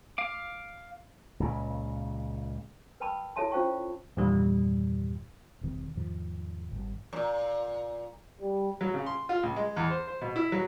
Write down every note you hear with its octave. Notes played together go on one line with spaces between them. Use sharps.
F5 D6
C#2 A#2 C#3
A#4 B4 G5 A5 B5 D6
E4 A4 C#5 E5 A5 C6
C#4 F4 C5 F5 G5 C#6
E2 G2 A#2 D#3 G3
E1 C2 C3 D#3
E2 G#2 D#3 F3
G#1 G2
F#2 A#2
G3
F#3
C#3
C6
F4
C#2
G#3
E2
C5
C5
B2
E4
F#3